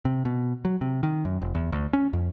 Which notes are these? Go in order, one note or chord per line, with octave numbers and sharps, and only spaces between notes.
C3
B2
F#3
C3
D#3
F#2
F1
E2
D2
C#4
F2